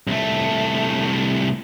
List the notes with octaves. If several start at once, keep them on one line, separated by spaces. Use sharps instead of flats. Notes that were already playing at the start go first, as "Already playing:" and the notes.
C2 A3